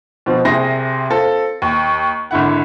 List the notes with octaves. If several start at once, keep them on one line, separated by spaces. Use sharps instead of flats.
B2 F3 C4
C2 C3 G#4 C6 A#6
C4 F4 A4
D#2
G#1 D3 E4 F#5